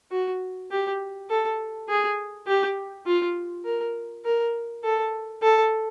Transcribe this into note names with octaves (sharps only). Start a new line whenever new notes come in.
F#4
G4
A4
G#4
G4
F4
A#4
A#4
A4
A4